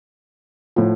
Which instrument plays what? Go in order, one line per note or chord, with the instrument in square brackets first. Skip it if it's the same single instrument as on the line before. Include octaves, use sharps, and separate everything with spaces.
[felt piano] A2 F3